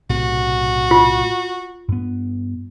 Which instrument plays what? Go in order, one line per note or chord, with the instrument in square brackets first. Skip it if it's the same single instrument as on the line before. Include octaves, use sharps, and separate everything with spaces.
[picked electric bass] B1 A2 C3 [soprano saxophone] F#4
[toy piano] F4
[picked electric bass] G2 B3